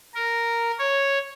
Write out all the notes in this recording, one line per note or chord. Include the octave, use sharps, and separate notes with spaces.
A#4
C#5